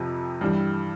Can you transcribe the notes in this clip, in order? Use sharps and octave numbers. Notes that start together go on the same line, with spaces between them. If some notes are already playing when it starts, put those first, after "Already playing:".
Already playing: F2 C3 F3
G2 E3 G3